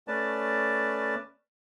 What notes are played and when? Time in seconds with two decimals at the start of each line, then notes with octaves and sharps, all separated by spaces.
0.08 A3 C#4 B4 D5 A5